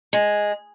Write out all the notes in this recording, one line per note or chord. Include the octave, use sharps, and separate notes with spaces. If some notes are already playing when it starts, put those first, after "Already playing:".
G#3